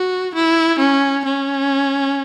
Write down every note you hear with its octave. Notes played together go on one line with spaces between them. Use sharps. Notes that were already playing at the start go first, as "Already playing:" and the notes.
Already playing: F#4
E4
C#4
C#4